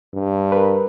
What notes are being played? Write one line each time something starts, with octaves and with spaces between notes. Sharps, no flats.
G2
A#4 B4